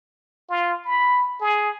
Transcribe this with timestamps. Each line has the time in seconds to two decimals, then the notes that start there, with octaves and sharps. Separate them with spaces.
0.49 F4
0.85 B5
1.41 G#4